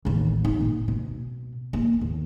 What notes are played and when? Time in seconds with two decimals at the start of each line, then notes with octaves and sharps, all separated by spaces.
0.05 A1 D#2
0.45 D#4
0.60 A#2
0.88 B2
1.73 A#3
2.01 D#2